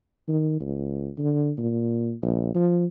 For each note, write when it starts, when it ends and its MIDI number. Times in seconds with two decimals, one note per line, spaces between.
0.28 0.59 51
0.61 1.10 37
1.18 1.52 50
1.58 2.14 46
2.22 2.50 34
2.55 2.86 53